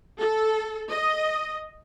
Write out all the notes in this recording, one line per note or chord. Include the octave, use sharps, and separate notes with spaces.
A4
D#5